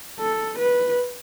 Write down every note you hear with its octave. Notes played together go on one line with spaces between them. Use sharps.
A4
B4